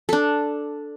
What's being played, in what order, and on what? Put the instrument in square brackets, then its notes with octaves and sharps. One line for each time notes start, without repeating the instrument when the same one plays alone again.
[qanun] D4 A4